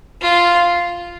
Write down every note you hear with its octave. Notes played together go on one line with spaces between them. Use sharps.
F4